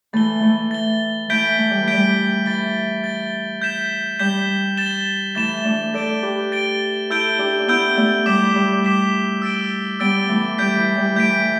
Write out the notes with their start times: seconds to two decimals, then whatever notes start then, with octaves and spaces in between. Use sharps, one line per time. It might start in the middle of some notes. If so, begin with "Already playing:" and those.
0.13 E3 A3 A6 G7
0.42 E3 A3
0.71 A6 G7
1.29 E3 A3 G6 B6 D7 G7
1.58 A3
1.70 G3
1.81 E3
1.88 G6 B6 D7 G7
1.93 G3
2.46 E3 A6 G7
3.04 A6 G7
3.62 G6 B6 E7 G7
4.19 G3 G6 B6 E7 G7
4.77 A6 E7 G7
5.35 E3 A3 A6 E7 G7
5.64 A3 D4
5.94 A4 D5 A6 D7 G7
6.22 G4 B4
6.52 A6 D7 G7
7.10 E4 A4 E6 G6 D7 G7
7.39 D4 G4
7.61 D4
7.68 B3 E4 E6 G6 D7 G7
7.97 A3 D4
8.26 G3 D6 B6 E7 G7
8.55 G3
8.85 D6 B6 E7 G7
9.42 E6 A6 D7 G7
10.00 G3 B3 E6 A6 D7 G7
10.29 E3 A3
10.58 G3 G6 B6 D7
10.77 E3
10.97 G3
11.16 E3 A3 G6 B6 D7